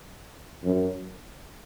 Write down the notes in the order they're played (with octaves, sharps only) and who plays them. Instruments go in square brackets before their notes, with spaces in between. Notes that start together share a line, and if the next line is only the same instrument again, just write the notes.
[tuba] F#2